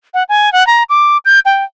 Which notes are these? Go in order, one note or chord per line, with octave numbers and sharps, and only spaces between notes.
F#5
G#5
F#5
A#5
D6
G6
G5